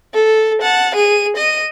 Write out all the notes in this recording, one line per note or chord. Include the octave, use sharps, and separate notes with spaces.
A4
F#5 A5
G#4 D#7
D#5 D#7